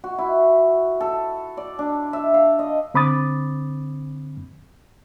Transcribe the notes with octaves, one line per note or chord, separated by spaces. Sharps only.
F#4
E4
A4
D5
D4
E5
F5
D#5
D3 C4 B5 D6 D#6 A6